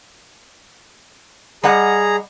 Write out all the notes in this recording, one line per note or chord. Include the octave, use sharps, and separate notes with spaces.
G3 G#4 D#5 F#5 A#5